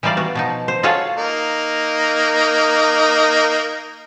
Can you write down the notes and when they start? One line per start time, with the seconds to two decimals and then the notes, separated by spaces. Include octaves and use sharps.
0.03 E3 G3 D#4 C5 D5 F5
0.17 B3 F#4
0.35 B2 F3 D#4
0.68 C5
0.83 F4 F#4 G#4 A4 C#5 F5
1.17 A#3 D#4